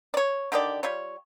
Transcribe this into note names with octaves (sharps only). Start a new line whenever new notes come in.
C#5 D5
D3 D#3 G4 D5
G3 F4 C#5